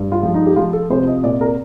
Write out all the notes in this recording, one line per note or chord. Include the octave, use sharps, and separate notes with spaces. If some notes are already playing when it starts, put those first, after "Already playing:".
Already playing: G2
F4
F3
D#4
G4
F3 F4
A4
C3 C5
D#5
A#2 D5
A#4